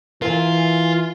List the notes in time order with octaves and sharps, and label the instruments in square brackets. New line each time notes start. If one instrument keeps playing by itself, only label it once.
[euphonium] E3 [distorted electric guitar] F4 [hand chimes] A#4 F5 G#5